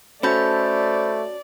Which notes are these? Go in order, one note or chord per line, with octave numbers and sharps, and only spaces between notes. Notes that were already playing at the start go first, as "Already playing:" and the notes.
A3 C#4 F#4 A4 C5 D5 B5 G6